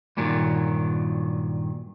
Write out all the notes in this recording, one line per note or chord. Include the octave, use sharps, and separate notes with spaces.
G2 A#2 D#3 F#3